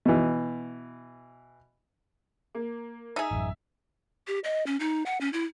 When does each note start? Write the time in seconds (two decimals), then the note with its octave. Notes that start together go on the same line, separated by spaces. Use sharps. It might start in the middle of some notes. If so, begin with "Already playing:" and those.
0.05 B2 E3
2.55 A#3
3.16 D#4 G#4 E5
3.31 A1 F#2
4.27 G4
4.44 D#5
4.66 C#4
4.80 D#4
5.06 F#5
5.21 C#4
5.33 E4